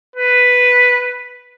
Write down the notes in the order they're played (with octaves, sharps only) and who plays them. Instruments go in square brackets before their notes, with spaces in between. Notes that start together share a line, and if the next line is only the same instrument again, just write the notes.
[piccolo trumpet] B4